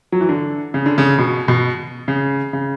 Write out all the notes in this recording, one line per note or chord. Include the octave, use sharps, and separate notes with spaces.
F#3
E3
D3
C#3
D3
C#3
B2
B2
C#3
C#3